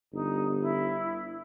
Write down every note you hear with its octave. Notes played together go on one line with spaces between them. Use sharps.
G1 D#4
E4